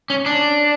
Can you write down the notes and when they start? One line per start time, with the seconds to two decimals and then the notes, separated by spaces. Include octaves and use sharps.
0.10 C#4
0.26 D4